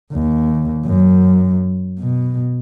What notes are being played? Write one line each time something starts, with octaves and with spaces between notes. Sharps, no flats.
D#2
F#2
B2